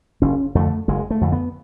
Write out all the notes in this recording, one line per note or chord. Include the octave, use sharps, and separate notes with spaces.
F#1 C#4
F2 D3 A3
F#1 G#3
A3
F2 D3
B3